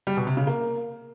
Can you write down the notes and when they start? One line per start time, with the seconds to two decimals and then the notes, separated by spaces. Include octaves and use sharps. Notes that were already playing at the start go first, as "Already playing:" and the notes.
0.07 G3
0.17 B2
0.27 C3
0.37 C#3
0.47 A#3